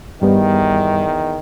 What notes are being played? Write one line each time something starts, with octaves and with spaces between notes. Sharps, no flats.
E2 G2 D#3 G3 B3